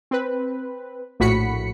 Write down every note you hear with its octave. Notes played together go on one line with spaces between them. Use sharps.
C4 B4
A#1 A2 F#4 B5 B6 C#7